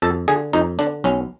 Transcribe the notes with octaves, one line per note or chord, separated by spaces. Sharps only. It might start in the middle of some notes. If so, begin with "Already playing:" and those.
F2 A4
D3 G#4
F2 D#4
D3 D4
B1 C#4